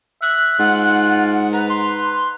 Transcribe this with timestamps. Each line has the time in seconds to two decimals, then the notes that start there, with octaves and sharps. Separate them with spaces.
0.22 E5 F#6
0.59 G#2 F4 F#5
1.53 B4 A#5
1.69 C6